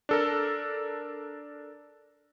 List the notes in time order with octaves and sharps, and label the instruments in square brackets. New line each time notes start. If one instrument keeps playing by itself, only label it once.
[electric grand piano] D4 A4 A#4